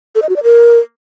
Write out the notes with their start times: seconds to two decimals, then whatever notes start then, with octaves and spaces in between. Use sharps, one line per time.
0.15 A4
0.22 D#5
0.29 F#4
0.36 D5
0.43 A#4